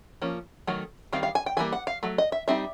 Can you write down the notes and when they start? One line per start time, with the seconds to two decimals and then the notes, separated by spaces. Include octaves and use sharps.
0.22 F3 A#3 C#4
0.67 D#3 F#3 A3
1.13 D#3 G3 C4 F5
1.23 F5
1.35 G#5
1.46 G5
1.57 E3 G3 A#3 G#5
1.73 F#5
1.87 F5
2.03 F#3 A3
2.18 D#5
2.32 E5
2.48 G3 C4 D#4 E5